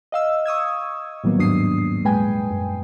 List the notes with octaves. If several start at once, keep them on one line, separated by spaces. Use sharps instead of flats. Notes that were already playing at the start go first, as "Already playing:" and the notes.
D#5 F5 E6
C#6 D#6 E6 G#6
A2 D#3 F#3 G3 A#3 B3
E2 G#2 F#3 D4 D#6 C7
D#2 A#2 G#3 B4 G5 G#5
F#2